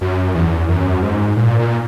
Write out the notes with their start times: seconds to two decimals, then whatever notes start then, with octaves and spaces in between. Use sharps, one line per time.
0.01 F#2
0.35 E2
0.69 F#2
1.03 G#2
1.37 A#2
1.59 A#2